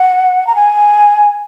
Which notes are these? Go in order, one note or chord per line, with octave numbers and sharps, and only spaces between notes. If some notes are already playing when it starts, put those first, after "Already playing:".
Already playing: F#5
A#5
G#5